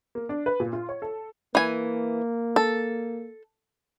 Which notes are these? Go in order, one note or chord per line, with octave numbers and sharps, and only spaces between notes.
A#3
D4
B4
A#2
F4
C#5
A4
E3 A#3 G#5
A4